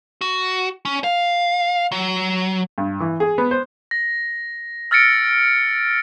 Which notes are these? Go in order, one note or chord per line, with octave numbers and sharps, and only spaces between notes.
F#4
C#4
F5
F#3
G2
E3
G#4
B3
C5
A#6
E6 F6 A6 A#6 C#7 D7